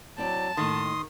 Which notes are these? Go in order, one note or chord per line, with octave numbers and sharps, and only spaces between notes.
F#3 C4 E4 D5 A5
D#2 A2 D#3 A4 C6 D#6